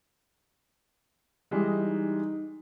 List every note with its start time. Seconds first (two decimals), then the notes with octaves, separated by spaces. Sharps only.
1.51 E3 G3 G#3 D#5
1.75 D#4